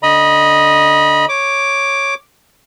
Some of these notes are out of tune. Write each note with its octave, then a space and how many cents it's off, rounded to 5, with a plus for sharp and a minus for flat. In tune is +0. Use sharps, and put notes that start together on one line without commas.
D3 +0 D#5 +0 B5 -30
C#5 -5 D6 +0